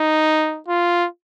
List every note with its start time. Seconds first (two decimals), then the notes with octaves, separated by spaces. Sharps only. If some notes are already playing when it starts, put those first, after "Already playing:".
Already playing: D#4
0.68 F4